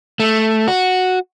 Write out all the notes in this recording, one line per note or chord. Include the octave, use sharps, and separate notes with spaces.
A3
F#4